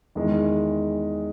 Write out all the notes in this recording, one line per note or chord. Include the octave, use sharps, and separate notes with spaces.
E2 D#3 G#3